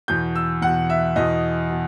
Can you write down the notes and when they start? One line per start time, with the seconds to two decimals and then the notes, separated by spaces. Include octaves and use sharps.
0.08 E2 B2 G6
0.35 E6
0.62 E2 B2 F#5
0.90 E5
1.16 E2 B2 D#5
1.70 B2